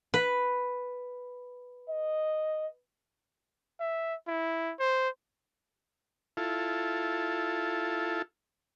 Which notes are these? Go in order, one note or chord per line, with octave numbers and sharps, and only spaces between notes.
B4
D#5
E5
E4
C5
E4 F4 A4